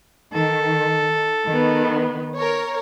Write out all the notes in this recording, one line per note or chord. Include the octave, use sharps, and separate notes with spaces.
D#3 A4
D#3 B3
A#4 C#5